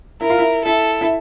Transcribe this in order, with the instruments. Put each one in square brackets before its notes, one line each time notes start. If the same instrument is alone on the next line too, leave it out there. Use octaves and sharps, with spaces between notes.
[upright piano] E4 [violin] A#4
[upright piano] F4
E4
[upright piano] E4 [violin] A4
[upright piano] E4